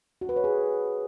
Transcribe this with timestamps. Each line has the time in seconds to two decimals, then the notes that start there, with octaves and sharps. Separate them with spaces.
0.21 F#4
0.29 B4
0.36 C#5
0.44 G#4